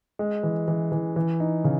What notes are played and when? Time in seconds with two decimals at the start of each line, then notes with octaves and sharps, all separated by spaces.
0.19 G#3
0.43 E3
0.68 E3
0.92 E3
1.16 E3
1.40 D#4
1.64 C#3